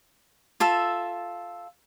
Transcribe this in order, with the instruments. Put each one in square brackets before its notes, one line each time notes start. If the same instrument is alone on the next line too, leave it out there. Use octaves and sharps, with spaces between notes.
[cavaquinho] F4 A4 E5